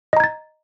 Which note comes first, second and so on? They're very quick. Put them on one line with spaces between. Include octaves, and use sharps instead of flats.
D#5 A#5 G#6 A6